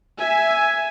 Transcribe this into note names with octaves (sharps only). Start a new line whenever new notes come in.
E5 G#5